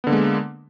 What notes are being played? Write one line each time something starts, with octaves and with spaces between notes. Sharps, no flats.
D3 G#3 A#3 B3